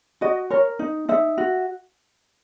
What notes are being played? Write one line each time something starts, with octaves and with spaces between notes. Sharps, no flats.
F#4 D#5
A#4 C#5
D#4
D#4 E5
F#4